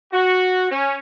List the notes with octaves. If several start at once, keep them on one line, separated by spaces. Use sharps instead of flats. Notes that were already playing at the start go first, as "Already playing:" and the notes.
F#4
C#4